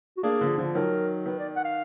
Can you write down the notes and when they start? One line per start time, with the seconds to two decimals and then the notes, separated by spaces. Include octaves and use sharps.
0.17 F#4
0.23 A#3 D4 G#4
0.41 D3 F3
0.58 D3 F3
0.75 D#3 F#3 A#4
1.26 D#3 B4
1.39 D5
1.56 F#5
1.64 F5